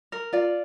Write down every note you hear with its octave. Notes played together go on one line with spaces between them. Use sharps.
A#4
F4 D5